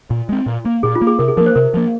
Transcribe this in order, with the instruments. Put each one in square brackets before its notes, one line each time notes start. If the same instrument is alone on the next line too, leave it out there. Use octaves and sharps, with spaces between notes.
[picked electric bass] A#2
G#3 C4
A#2
A#3
[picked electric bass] A#2 [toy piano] G#4
[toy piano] F4
[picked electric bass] A#3
[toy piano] G#4
[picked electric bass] C3 [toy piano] A#4
[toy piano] G#4
[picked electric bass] F3 A#3 [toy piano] A#4
[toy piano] C5
[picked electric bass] C3 [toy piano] A#4
[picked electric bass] F3 A#3